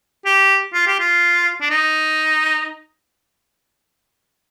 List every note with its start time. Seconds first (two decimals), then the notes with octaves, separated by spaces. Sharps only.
0.25 G4
0.73 F4
0.87 G4
0.99 F4
1.61 D4
1.70 D#4